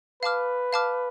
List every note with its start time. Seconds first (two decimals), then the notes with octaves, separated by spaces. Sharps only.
0.22 B4 F5 A5 D6 F6
0.73 F5 A5 D6 F6